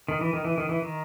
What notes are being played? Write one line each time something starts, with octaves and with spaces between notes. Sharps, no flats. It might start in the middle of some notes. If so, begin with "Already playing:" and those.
D#3
E3
D#3
E3
D#3
E3
D#3